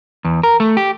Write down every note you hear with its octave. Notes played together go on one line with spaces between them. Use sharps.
E2
A#4
A3
G4